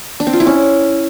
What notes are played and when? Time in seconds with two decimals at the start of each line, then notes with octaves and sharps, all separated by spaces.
0.20 D4
0.27 C4
0.33 F4
0.40 E4
0.47 C#4